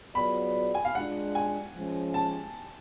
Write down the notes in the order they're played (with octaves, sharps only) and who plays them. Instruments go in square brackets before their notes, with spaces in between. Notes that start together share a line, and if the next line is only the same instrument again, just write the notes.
[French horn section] F#3 B3 F4 G#4 D5 [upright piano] B5
[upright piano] G#5
F5
[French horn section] G#3 D4 F4 [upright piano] F#5
[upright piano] G#5
[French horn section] F3 G#3 C#4
[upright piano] A5